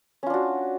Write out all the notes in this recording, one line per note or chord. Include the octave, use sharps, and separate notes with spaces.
C#4 D4 F4 F#4